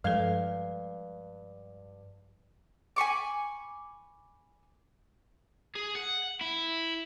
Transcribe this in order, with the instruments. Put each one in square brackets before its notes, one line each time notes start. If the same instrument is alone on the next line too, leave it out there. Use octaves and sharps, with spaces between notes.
[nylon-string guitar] G2 F5 [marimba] F3 G#3 A4
[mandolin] G#5 B5 C#6 D6
[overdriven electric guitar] G#4
F#5
E4